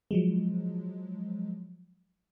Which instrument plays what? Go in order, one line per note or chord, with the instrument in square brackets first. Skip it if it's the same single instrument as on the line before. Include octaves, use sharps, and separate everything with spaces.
[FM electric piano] F3 F#3 G#3